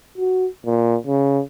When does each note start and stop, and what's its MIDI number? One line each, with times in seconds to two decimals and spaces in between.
0.18 0.47 66
0.66 0.97 46
1.07 1.42 49